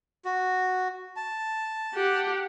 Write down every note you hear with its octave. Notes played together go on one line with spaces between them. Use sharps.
F#4
A5
G4 F#5